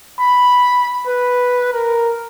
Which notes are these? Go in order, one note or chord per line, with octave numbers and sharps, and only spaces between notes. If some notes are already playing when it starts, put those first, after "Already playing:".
B5
B4
A#4